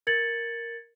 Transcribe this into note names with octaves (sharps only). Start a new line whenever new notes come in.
A#4 G#6 A6 C#7 F#7